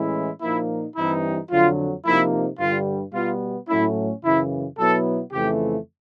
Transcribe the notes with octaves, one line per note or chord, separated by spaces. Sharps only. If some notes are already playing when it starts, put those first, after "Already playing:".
Already playing: A2 E3 G#3 C#4 E4
A#2 F3 A#3 D#4 E4
G2 E3 G3 C4 D#4 E4
F2 D3 F#3 F4
C3 F3 A#3 D#4 E4
G2 D3 G3 F4
B2 G3 B3 F4
A2 F#3 A3 C#4 E4
F#2 C#3 E3 E4
B2 F#3 B3 E4 A4
F2 C#3 E3 A3 G4